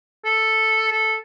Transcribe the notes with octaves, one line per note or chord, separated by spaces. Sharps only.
A4
A4